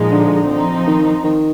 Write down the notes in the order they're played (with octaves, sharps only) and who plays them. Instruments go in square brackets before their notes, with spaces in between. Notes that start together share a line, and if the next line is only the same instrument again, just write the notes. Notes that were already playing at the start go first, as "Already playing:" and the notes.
Already playing: [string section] A#2 F3 G#3 D#4
[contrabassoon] D3
[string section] F3 C4 D#4
[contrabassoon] D#3
D#3